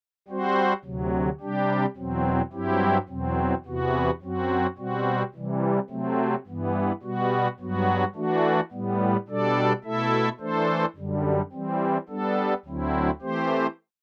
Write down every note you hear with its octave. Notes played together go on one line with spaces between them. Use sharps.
G3 C4 F#4 C5
D2 C3 F#3
C3 G3 D4 G4
E2 B2 F#3 C4
G2 F#3 C4 E4 G4
E2 B2 F#3 C4
E2 C3 E3 B3 F#4
F#2 F#3 C4 F#4
B2 G3 C4 F#4
C3 E3 G3
C3 F#3 A3 C4
G2 E3 B3
B2 G3 B3 F#4
G2 F#3 B3 F#4
E3 A3 D4 F#4
A2 G3 B3
B2 G3 D4 A4 D5
B2 A3 E4 A4 E5
E3 A3 D4 A4 C5
F#2 D3 G3
E3 G3 C4
G3 B3 D4 A4
D2 D3 F#3 C4 E4
E3 A3 C4 G4 C5